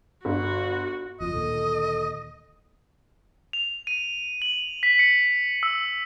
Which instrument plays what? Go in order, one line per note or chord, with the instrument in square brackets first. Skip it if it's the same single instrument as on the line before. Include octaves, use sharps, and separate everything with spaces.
[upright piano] G1 [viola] F#4
[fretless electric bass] F#1 F2 [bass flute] F4 [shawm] D#5
[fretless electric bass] D2 A#2 D#3 [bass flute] A4
[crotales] F7
D#7
F#7
B6
C#7
E6